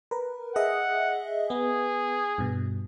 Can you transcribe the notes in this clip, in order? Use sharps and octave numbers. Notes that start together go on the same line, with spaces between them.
A#4 B4
G#4 D#5 E5 F#5
B3 G#4
G2 B2